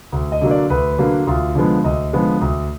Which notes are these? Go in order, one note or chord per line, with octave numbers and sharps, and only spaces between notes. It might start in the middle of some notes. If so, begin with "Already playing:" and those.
D2
D#5
D3 F#3 A#3
D5
D2 B4
D3 F#3 A#3
D2 F4
D3 F3 G#3 B3
D2 D#5
D3 F3 G#3 B3
D2